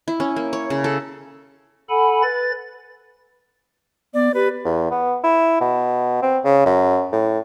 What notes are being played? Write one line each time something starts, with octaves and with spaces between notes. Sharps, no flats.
E4
C#4
A#3
C#5
C#3
A4
A4 F#5 G#5 B5
B4 A6
B3 D5
G4 B4
E2
B3
E4
B2
C4
C#3
F#2
A2